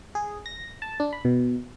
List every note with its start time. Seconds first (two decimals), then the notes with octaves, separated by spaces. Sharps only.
0.15 G#4
0.46 A#6
0.82 A5
1.00 D4
1.13 B5
1.25 B2